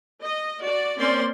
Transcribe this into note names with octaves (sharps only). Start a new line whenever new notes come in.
D#5
F#4 D5
A#3 C4 C#4 C5 D5 C6